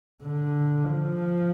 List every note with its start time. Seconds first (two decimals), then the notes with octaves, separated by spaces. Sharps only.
0.23 D3
0.94 F3